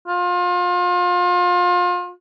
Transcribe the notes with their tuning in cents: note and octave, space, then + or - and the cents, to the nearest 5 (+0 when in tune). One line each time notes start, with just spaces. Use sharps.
F4 +30